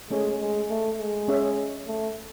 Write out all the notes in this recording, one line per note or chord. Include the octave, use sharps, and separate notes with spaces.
G#3 A3 C#4 G#4 C#5
G#3
A3
G#3
C#4 G#4 C#5 E5
A3